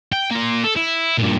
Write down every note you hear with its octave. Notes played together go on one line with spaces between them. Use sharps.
G5
A#3 F4
A4
E4
G2 A#2